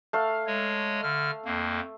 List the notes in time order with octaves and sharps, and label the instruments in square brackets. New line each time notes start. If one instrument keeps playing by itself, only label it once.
[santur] A3 F5
[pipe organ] G#3 C#5
D3 F6
F2 A#3